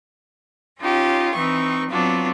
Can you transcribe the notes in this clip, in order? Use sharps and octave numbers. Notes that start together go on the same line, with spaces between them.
C#4 D#4 F4 G4
E3 C4 D#4 C#6
F#3 B3 C4 D4 F4 F#4